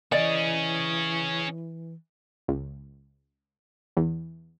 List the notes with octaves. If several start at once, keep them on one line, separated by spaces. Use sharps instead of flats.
E3 C#4 G#4 D5 D#5
C#2
E2